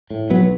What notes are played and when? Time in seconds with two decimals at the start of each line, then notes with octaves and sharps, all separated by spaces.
0.10 A2
0.30 B1 F#3 B3